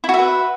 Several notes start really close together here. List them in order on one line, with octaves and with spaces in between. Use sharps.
E4 F#4 E5 B4